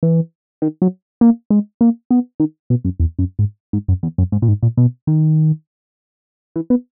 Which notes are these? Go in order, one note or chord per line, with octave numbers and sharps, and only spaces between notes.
E3
D#3
F#3
A#3
G#3
A#3
B3
D#3
B2
F#2
E2
F#2
G#2
G#2
F#2
E2
F#2
G#2
A#2
G#2
A#2
B2
D#3
E3
B3